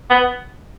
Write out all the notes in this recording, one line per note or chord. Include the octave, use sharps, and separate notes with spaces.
B3